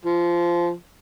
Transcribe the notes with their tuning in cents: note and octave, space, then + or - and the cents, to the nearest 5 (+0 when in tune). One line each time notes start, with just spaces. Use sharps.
F3 -15